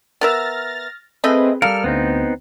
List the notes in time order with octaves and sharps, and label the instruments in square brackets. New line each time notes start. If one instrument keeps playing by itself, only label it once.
[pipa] B3 A#4 E5 [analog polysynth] F6 A6 A#6
[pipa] A3 D#5 B5 [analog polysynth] C4 G#4 B4
[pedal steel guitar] G3 A4 A#4 [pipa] F5 [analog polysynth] F6
[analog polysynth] D2 [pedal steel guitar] B3 C4 D#4